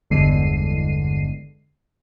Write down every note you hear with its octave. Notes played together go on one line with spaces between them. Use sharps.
G1 E2 D3 G#3 C7 D#7